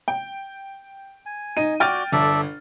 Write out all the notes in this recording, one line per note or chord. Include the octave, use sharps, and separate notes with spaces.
G5
G#5
D#4 D#7
F#4 D5 G5 F6 A6
G1 A4 D5 E5